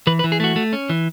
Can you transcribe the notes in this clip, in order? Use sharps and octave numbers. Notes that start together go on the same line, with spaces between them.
E3 B4
B4
E3
G#4
A3 F#4
A3
C#4
E3